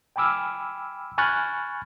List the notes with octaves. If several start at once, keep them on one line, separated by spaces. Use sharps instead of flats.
G5 G#5 B5 D6 E6 F6
G#5 B5 C#6 F6 F#6 A6